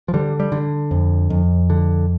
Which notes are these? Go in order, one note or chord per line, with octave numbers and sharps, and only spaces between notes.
F3
D3 G3
G3
D3
F2
F2
D3